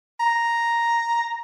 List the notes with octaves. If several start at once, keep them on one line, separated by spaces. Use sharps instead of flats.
A#5